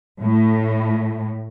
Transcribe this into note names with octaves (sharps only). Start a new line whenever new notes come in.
A2